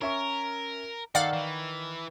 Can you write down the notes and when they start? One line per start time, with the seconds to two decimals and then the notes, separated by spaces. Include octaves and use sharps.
0.02 C#4 A#4 E5 C#6
1.15 D#3 A4 D5 F5 F#5
1.33 E3